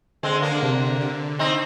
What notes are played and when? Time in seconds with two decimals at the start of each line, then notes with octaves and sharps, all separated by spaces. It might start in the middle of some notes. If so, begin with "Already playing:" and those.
0.23 D3 G#3 C4
0.42 A#3 D4
0.62 C3
1.01 D3
1.39 C4 D#4